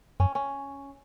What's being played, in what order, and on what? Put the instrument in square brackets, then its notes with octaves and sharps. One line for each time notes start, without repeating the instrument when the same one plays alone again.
[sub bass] F#2 [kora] C#4
[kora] C#4